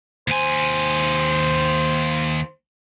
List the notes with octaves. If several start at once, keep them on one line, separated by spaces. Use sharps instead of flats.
D#2 C5 G#5